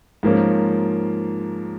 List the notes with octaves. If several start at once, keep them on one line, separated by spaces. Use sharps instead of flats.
G#2 F3 A#3 C#4